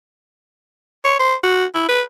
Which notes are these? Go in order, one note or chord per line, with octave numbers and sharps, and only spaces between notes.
C#5
C5
F#4
E4
B4